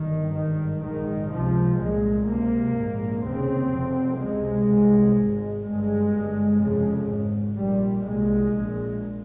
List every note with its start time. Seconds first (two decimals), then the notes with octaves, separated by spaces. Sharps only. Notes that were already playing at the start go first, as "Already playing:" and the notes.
Already playing: G1 G2 D#3
0.35 G#1 G2 D#3
0.83 A#1 G#2 D#3
1.31 C#2 C3 F3
1.79 C2 A#2 G#3
2.27 C#2 C3 A#3
2.75 A#1 G#2
3.23 F1 D#2 C#3 C4
3.71 F1 F2 C3
4.19 C#2 C3 G#3
4.68 C2 C3
5.16 G#1 G#2
5.64 G1 G2 G#3
6.12 G1 G2
6.60 F1 F2 C#3 G#3
7.08 G#1 G#2
7.56 A#1 A#2 G3
8.04 C2 A#2 G#3
8.52 A#1 A#2